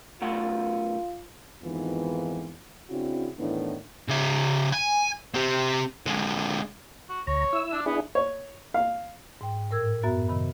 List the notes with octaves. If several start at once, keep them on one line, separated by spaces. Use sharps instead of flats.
B1 A3 F4 F#5
F2 G#2 D#3 E3 B3 F4
C#3 C4 D4 E4 F#4
A2 D#3 E3 B3 D4
C#3 E5
G#5
C4 G4
D3 G#3
F#4
D2 C#5 A#5
E4 E6
D4
B3 D4 E4 G#4
C#5
F5
G#2 G5
A2 A#4 E6 G#6
F#2 B3 F#4 E5 A6
C3 D#3 B5